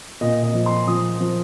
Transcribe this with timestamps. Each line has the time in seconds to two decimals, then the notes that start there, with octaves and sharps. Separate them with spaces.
0.21 A#2 D#5
0.43 D#5
0.54 F3
0.66 C6
0.87 F3 D#6
1.20 F3